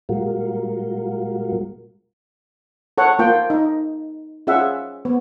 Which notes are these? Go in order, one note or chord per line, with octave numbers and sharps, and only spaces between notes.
A#2 G3 G#3 F4 F#4 A#4
A4 C#5 F#5
A#3 F4 G5
D#4
C#4 F4 G#4 E5 F#5
B3